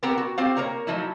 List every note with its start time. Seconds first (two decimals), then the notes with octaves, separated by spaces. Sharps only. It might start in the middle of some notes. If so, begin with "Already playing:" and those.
0.03 B3 C4 G4 A#4 B4 A#5
0.18 F#4
0.38 C4 F4 G4 C5 F5
0.57 A#3 A#4 C#5 A#5
0.87 F3 F#3 A3 D#4 E4